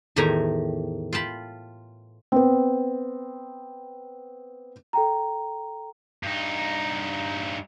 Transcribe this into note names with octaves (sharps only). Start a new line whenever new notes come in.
E2 A2 D#3 G4 G#5 A#5
F4 G5 A5 B5
B3 C4
A4 G5 A#5
G2 D#4